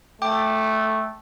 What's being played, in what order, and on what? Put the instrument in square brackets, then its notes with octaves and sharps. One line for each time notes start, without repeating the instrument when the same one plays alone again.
[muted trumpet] A3 [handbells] G5 D6